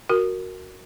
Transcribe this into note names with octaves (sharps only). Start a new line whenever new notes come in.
F#4 A#4